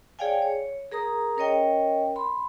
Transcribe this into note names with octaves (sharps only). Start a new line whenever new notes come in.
G#4 C#5 D5 F5 G5 G#5
C#5
G#4 A#4 A#5 D#6
C#4 A#4 C#5 D#5 G5
B5 C6